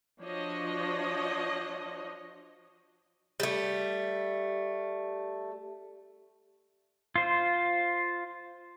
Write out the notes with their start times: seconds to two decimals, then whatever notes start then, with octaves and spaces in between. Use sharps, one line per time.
0.22 F3 D4 F#4 C#5 D#5
3.40 G3 A3
7.16 F4 C5